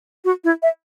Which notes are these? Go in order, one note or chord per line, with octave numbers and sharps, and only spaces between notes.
F#4
E4
E5